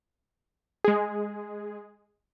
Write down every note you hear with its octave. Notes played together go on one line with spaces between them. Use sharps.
G#3 G#4